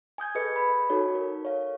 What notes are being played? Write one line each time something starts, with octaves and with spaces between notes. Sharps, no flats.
G#5 D#6 G6 G#6
G#4 A4 B4 D#5 G6 C#7
B5
D#4 F#4 A4 C#5
A#4
C#5 F5